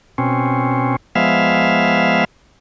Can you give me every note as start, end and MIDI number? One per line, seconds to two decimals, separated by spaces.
0.18 0.96 47
0.18 0.96 60
0.18 0.96 61
1.16 2.24 53
1.16 2.24 56
1.16 2.24 59
1.16 2.24 76
1.16 2.24 77